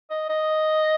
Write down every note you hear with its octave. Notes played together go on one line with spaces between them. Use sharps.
D#5
D#5